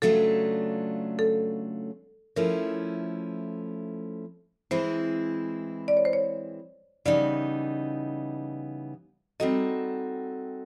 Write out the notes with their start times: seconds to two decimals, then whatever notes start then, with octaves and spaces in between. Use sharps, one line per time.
0.02 C#3 F#3 A3 D4 F4 A4
1.19 A4
2.36 F3 A3 C#4 E4 A#4
4.71 E3 G#3 C4 E4 C5
5.88 D5
5.97 C#5
6.05 C5
6.13 C#5
7.05 C#3 E3 G3 B3 D#4 D5
9.40 G3 C4 D#4 F#4 A4 D#5